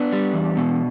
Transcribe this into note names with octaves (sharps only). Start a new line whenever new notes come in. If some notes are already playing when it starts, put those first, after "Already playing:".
Already playing: B3 D4
G3
E2
B2